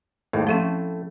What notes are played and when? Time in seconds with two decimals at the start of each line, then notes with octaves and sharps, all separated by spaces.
0.33 G#1 D#2 A2
0.47 A2 F3 A3 C4 C#4